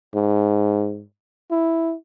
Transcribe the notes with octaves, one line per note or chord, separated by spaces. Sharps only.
G#2
E4